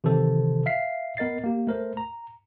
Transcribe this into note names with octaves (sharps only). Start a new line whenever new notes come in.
C3 D#3 E3 A4 C5
E5 F5 B6 C7
B3 A#4 D#5 A6 C7
A#3 G4
A3 A#4 C5
A#5